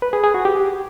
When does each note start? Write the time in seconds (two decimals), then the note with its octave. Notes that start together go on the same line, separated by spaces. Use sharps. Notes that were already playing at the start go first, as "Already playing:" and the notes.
0.02 B4
0.13 G#4
0.24 G#4
0.34 F#4
0.45 G4